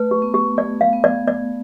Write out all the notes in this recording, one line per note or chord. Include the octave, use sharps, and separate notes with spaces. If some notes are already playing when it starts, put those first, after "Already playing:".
Already playing: A3 B4
G4
B3
G4
A3 D5
F5
B3
D5
D5